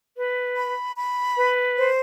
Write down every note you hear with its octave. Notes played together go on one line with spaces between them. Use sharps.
B4
B5
B5
B4
C5